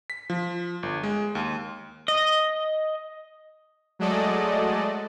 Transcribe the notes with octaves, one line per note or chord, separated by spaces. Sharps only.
B6
F3
G1
G#3
D#2
D#5
F#3 G#3 A3 A4 D5 D#5